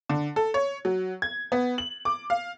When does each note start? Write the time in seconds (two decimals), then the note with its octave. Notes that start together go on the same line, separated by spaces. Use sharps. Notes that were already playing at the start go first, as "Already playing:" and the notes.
0.09 D3
0.36 A4
0.54 C#5
0.85 F#3
1.22 G#6
1.52 B3
1.78 F#7
2.05 D6
2.30 F5